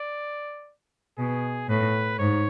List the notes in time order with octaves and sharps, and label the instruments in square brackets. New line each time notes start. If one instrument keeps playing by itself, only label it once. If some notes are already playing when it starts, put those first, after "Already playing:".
Already playing: [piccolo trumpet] D5
[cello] B2 [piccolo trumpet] G#4
[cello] A2 [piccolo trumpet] B4
[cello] G#2 [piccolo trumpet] C#5